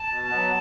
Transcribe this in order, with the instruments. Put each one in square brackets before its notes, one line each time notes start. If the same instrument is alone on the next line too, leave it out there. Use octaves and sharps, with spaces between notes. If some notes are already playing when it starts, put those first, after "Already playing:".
Already playing: [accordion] A5
B2
F#3 B3